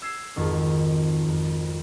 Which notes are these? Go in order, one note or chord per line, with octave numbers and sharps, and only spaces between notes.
E6 G#6 C7 E7
G#1 F2 D#3
F2